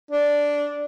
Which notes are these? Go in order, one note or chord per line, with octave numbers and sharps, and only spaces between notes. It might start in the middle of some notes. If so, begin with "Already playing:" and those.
D4